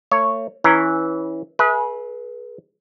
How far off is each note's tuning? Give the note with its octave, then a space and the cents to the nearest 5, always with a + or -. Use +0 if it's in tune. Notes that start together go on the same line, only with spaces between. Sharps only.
A3 +40 C#5 +0
E3 -15 C#4 +0 A#5 +0
G#4 +25 B4 -30 E5 -15